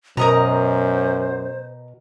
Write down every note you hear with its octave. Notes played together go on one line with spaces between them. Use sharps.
F#2 B2 A#4 C5 D#5 A#5